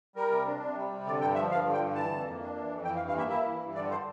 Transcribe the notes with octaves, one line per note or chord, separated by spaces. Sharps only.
G3 A#4
C3
D4
C3
G3
C3
D3 D5
G2 G5
F3 E5
G2 F5
D3
G5
G2
E3 A5
F2
A#3
D4
E3
F2
E3 G5
F5
G2
F5
A#3 E5
E4 E5
E3
G2
D3 D5
C5